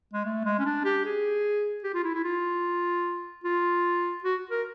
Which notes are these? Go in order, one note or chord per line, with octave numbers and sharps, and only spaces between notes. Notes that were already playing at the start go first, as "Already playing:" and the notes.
G#3
A3
G#3
C#4
D4
G4
G#4
G4
F4
E4
E4
F4
F4
F#4
A#4